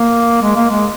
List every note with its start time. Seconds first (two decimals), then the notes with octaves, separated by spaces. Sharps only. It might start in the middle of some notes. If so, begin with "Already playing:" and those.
Already playing: A#3
0.41 G#3
0.56 A#3
0.70 G#3